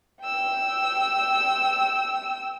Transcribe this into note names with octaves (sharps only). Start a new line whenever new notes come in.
G5 E6